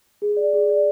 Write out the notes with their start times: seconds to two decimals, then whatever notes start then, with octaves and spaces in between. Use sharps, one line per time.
0.22 G#4
0.37 D5
0.54 G#4
0.69 D5